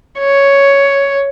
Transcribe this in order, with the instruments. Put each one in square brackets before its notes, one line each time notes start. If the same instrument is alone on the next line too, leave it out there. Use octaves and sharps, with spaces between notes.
[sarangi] C#5